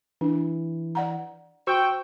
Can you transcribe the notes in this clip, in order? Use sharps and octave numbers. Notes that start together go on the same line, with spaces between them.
E3 D4
D5 F#5 A#5
F#4 C5 G5 C#6 E6